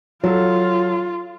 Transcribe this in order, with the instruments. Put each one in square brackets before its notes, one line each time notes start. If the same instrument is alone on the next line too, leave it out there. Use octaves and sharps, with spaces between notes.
[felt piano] F#3 A4 [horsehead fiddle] F4